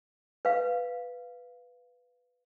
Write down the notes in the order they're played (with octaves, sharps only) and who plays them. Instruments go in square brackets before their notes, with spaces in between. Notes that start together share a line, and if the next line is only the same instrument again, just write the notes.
[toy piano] B4 F5